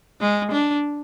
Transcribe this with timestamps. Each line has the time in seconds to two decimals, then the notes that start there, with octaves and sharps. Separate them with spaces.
0.20 G#3
0.52 D4